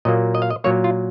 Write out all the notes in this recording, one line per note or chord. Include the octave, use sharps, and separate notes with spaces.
A#2 F#3 A#3 D#5
D#5
F5
D#5
A#2 F#3 A#3 C#5
F4